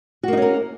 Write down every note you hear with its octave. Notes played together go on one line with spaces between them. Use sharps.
A#3 C#4 D#4 F#4 A#4